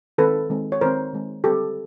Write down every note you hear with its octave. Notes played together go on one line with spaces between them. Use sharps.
D#3 G#3 C4 A4 B4
D#3 G#3 C4
C#5
D#3 G#3 C4 A#4 C5
D#3 G#3 C4
D3 G3 C4 G4 A4